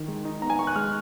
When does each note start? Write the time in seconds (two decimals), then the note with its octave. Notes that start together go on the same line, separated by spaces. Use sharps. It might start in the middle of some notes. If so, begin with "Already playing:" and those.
Already playing: D#3
0.08 G#3
0.25 D#4
0.42 B3 A#5
0.50 G#5
0.59 D#4 C#6
0.67 F#6
0.76 G#3 F6